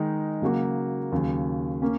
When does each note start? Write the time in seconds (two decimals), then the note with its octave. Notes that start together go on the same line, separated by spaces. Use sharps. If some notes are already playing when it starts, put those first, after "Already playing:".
Already playing: D#3 G#3 D#4
0.42 C#3 F#3 A#3 F#4
1.12 D#2 C#3 F#3
1.82 A#3 C#4